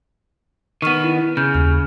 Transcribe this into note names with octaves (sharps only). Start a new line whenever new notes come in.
D#3 B3 C#6 F6 D#7
E4
C#3 F6 G6
D#2 F6